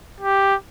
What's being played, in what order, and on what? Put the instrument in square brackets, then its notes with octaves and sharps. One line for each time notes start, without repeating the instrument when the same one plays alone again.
[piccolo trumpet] G4